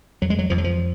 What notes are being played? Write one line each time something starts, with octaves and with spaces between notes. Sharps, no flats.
F2 F#3
G#3
F#3
F2 F3
F#3
F3